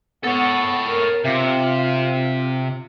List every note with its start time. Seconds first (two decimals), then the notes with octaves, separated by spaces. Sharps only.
0.23 B3 A4 C#5
0.87 A#4
1.25 C3 F4